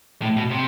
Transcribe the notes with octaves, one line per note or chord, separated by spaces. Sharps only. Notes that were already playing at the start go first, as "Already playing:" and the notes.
A2
B2
C3